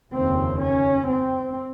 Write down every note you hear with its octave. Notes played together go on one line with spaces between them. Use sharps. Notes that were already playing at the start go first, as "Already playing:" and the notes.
F1 D#2 C#3 C4
C#4
C4